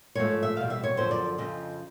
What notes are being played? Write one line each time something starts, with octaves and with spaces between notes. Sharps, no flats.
G#2 F3 A3 C#5
E5
E2 B2 G3 F5
E5
C#5
F#2 D3 F3 C5
D5
F2 C#3 F3 D#5